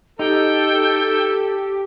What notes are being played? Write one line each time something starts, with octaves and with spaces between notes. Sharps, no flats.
D#4 G4 A4 G5